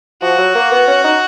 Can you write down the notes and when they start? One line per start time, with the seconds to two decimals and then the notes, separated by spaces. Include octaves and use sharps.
0.22 F3 F#4
0.38 F#3
0.55 A#3
0.72 B3
0.88 C#4
1.04 D#4